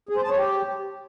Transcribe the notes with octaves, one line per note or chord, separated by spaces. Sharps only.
G#4
C5
A5
C#5
G4